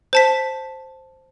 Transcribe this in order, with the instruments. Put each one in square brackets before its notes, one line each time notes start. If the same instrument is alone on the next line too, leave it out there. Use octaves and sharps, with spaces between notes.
[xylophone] C5 A5 B6